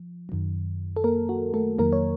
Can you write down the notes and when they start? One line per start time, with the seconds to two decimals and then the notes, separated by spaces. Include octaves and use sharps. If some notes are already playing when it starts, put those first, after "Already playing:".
Already playing: F3
0.29 F#2 D#3 F#3
0.96 A4
1.04 A#3 A#4
1.29 F#4
1.54 A3 A4
1.79 F2 D#3 F#3 A#3 A#4
1.93 C#5